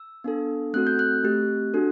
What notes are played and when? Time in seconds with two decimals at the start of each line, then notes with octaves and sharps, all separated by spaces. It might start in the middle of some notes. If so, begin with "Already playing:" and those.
Already playing: E6
0.24 B3 D4 A4
0.73 A3 C4 F#4 A4 F#6
0.87 G6
0.99 F#6
1.23 A3 C4 G4
1.74 D4 F#4 A4